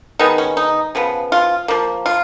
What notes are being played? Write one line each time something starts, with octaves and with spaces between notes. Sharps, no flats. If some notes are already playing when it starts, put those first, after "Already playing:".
D#3 G#3 B3 D#4
C#4
D#4
C#3 F3 B3
F4
F3 A#3
F4